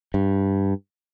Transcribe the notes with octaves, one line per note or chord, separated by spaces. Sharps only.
G2